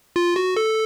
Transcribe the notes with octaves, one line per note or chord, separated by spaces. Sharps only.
F4
F#4
A4